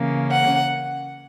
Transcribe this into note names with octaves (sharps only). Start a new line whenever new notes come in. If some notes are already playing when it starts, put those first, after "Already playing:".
Already playing: C#3 E3 A#3 C#4
F#5